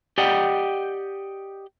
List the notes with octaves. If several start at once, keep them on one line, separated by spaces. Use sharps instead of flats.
G4 D5 D#5 F#5 G5